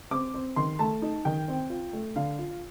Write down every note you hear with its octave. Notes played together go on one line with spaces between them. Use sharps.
C4 D6
C4
D#3 C6
A3 A5
D#4
D#3 G5
C4
F4
A3
D3 F5
F4